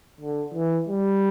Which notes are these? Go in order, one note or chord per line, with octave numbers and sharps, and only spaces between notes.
D3
E3
G3